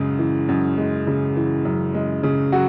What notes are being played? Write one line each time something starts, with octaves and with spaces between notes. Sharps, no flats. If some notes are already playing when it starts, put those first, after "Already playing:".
Already playing: F#2 C#3 G#3
E3
F#2
G#3
C#3
E3
F#2
G#3
C#3
F#3 F#4